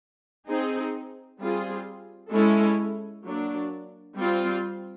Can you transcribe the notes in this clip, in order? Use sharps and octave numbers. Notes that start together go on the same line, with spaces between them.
C4 D#4 G#4
G3 C4 F4 G#4
G#3 C#4 E4 A4
F#3 A#3 D4
G3 C4 F4